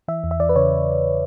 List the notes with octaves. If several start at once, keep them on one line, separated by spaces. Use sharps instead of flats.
E3 E5
E2
E5
E3 D5
B4
C#3 C#5